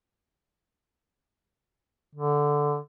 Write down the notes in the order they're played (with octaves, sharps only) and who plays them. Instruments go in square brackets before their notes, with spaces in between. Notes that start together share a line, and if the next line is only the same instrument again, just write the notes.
[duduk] D3